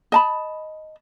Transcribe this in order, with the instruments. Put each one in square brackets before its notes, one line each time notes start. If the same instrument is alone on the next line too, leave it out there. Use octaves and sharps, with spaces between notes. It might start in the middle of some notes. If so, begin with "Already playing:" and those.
[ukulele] D#5 A5 B5